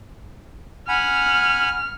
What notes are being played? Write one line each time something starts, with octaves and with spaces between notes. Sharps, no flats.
F#5 G#5 B5 F6